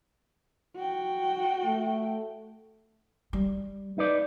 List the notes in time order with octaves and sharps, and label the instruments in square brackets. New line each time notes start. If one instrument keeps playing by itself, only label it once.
[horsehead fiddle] F#4 G5
[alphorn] A3
[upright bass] G3
[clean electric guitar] D#4 B4 D5